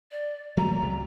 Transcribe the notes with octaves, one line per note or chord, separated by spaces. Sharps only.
D5
F#3 A3 A#3 A#5
C#2 C3